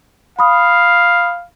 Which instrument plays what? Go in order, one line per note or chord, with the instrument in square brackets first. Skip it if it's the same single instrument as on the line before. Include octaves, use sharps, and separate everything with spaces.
[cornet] F5 [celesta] B5 D#6